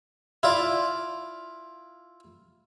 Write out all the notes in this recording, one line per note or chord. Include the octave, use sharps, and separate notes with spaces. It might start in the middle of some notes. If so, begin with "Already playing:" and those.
E4 F4 D5